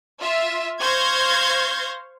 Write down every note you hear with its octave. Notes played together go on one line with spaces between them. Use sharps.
F4 E5
C5 F5 C#6 G6 G#6 A#6